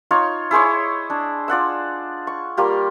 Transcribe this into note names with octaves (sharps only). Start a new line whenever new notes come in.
D#4 F4 C#5
E4 G#4 C5 C#5
D4
F4 D5 F#5 E6
C#6
G3 A#3 F4 G4